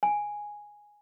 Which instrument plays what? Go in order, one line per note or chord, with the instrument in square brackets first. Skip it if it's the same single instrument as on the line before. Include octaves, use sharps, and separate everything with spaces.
[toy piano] G#5